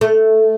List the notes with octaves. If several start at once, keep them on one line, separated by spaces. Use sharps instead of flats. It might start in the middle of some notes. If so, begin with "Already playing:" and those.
A3